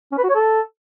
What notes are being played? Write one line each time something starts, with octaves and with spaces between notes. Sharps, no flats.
C#4
B4
F#4
C#5
A4